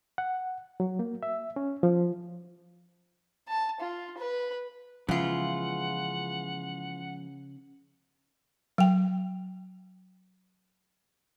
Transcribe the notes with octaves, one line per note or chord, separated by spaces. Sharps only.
F#5
F#3
A#3
E5
C#4
F3
A5
F4
B4
C#3 E3 F3 G#3 B3 F4 F#5
F#3 G5